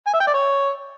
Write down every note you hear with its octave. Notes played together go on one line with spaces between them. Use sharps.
G#5
E5
G5
D5
C#5